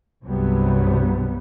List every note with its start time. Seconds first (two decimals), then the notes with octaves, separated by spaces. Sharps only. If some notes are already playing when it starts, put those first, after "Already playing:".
0.23 C2 G2 C3 F#3 G3 B3